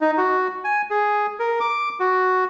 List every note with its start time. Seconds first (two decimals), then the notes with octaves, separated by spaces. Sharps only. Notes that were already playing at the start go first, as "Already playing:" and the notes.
0.01 D#4
0.18 F#4
0.64 G#5
0.91 G#4
1.39 A#4
1.60 D6
2.00 F#4